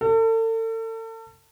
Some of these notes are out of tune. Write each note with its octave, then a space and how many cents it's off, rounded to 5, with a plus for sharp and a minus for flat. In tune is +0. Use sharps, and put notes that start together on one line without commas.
A4 +40